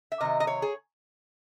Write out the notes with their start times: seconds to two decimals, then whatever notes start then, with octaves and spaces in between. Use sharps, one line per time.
0.12 E5
0.21 C3 D#3 F#3 D#5
0.40 D#5
0.47 C#5
0.62 G#4